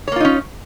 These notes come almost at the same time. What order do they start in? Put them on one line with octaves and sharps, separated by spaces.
C#5 A#3 F4 D#4 C#4